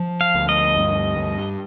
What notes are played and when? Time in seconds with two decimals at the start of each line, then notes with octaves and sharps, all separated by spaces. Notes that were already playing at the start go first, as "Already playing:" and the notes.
Already playing: F3
0.21 F5
0.34 D2
0.49 D#5
0.77 G2
1.18 G2